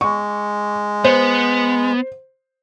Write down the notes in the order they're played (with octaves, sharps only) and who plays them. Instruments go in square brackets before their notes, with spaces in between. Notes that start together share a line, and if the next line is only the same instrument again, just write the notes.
[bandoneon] G#3 [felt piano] C#6
[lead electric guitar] B3 [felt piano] C5